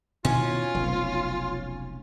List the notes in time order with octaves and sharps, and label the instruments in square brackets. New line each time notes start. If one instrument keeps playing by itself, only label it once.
[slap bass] B2 D#3 E3 [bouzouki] C#4 [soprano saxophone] F4
[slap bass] F1 B1